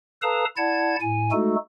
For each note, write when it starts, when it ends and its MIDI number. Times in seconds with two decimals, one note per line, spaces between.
0.22 0.44 69
0.22 0.44 71
0.22 0.44 77
0.22 0.44 81
0.22 0.44 82
0.22 0.44 87
0.57 0.96 64
0.57 0.96 74
0.57 0.96 78
0.57 0.96 81
0.57 0.96 92
1.01 1.32 45
1.01 1.32 80
1.32 1.56 56
1.32 1.56 57
1.32 1.56 63
1.32 1.56 66
1.32 1.56 69